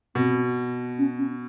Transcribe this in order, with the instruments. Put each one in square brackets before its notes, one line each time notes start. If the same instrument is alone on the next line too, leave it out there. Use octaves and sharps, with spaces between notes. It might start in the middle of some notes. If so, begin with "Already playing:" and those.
[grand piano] B2 [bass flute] C4
[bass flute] C#4
C#4